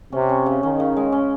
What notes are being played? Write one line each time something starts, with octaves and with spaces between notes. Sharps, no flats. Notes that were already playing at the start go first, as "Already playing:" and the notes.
C3 C#4
C#4
C#3
D#3 C#4
C#3
G#3
C#4